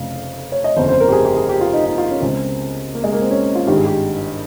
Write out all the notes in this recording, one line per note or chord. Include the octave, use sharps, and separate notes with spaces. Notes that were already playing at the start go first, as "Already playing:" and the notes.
Already playing: F1 F2 C#3 F5
C#5
D#5
G1 F2 C#3 C5
C5
A#4
G4
G#4
G4
G#4
G4
F4
D#4
D#4
F4
C#4
C#2 C#3 C4
A#3
G#3
A#3
C4
C#4
F4
G#1 G2 D#3 G4
G#4
G4